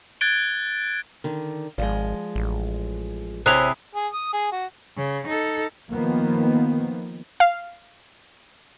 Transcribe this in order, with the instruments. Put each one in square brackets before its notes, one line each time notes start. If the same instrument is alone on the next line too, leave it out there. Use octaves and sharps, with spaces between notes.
[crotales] F#6 G#6 A6 D7 G7
[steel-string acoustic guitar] D3 D#3
[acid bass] G#1 [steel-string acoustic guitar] F3 G#3 [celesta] D5
[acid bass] A1
[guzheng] C3 E4 G#4 [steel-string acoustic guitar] C5 C#5 G#5 [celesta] F#6 F7
[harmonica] G#4
D#6
G#4
F#4
[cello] C#3
D#4 A4
[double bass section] D#3 F3 A#3 B3
[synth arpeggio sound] F5